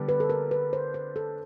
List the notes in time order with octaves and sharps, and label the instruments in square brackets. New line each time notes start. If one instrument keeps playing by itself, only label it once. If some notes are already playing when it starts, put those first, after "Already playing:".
Already playing: [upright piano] D3 G3 B3 D4
[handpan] B4
A4
A#4
B4
C5
C5
A4